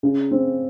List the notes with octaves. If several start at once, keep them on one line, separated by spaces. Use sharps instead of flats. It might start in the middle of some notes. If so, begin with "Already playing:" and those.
C#3
C4